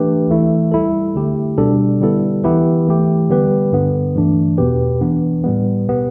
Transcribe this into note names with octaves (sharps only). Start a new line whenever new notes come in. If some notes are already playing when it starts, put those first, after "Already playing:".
Already playing: E3 A3 D4 G4 B4
E3 A3 E4
G3 E4 A4
D3 A3 G4
B2 G3 D4 A4
D3 G3 B3 E4 A4
E3 B3 E4 G4 B4
E3 A3 G4
D3 G3 B3 G4 B4
G2 D3 B3
G2 E3 A3 D4
E2 B2 B3 G4 B4
E3 B3 D4
A2 G3 B3
B2 B3 G4